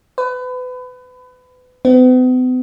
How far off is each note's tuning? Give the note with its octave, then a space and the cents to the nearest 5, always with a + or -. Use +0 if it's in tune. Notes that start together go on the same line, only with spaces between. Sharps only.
B4 +30
B3 +45